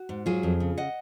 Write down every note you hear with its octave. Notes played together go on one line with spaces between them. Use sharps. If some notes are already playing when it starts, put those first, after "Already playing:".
Already playing: F#4
G#2
F#3 F4 G#4
F2
C#3
D#5 F#5